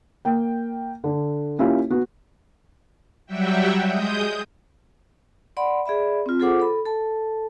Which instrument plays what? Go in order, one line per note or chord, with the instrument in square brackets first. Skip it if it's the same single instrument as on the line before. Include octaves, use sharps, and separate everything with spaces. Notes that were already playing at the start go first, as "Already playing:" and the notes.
[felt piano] A#3 G5
D3
A#3 C#4 E4 F4 G4
B3 F#4
[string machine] F#3 G3 F#4 E5 G5
G#3 D#6 G6
[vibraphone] D5 F#5 B5 C6
G#4 D5 E5 B5
C4 F4
F4 G#4 A4 C5 F#5 D6
A4 B5
A4 A5